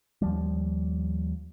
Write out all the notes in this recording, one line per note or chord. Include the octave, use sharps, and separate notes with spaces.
D#2 F3 G3